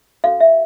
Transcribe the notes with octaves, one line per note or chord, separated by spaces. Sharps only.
C#4 F#4 A4 F5
E5